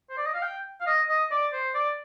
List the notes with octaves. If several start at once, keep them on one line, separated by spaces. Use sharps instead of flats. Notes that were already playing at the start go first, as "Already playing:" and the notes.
C5
D5
D#5
F5
G5
F5
D#5
D#5
D5
C5
D5